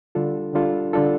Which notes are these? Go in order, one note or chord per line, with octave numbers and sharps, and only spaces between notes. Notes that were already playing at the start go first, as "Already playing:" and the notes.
D3 G3 D4 F4 A4
D3 G3 D4 F4 A4
D3 G3 D4 F4 A4